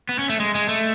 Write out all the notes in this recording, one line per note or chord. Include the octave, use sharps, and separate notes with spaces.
B3
C#4
A3
G#3
G#3
A3